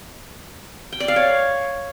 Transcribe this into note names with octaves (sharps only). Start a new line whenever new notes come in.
G5
D5
F5
C#5